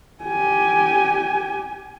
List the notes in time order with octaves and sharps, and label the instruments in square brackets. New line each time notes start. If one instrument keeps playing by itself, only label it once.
[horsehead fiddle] G4 G#5